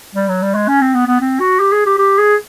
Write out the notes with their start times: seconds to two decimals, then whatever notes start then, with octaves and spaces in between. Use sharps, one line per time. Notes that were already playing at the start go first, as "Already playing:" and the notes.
0.15 G3
0.28 F#3
0.42 G3
0.55 G#3
0.68 C#4
0.81 C4
0.94 B3
1.07 B3
1.20 C4
1.40 F#4
1.60 G4
1.72 G#4
1.86 G4
1.98 G4
2.18 G#4